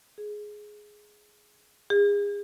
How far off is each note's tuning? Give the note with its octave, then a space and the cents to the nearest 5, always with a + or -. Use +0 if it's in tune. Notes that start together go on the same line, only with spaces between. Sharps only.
G#4 +10
G#4 -35